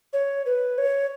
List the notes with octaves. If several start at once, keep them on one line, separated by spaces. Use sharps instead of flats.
C#5
B4
C#5